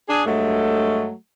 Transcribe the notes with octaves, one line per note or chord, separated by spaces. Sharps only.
D4 G#4
G2 F#3 G#3 A3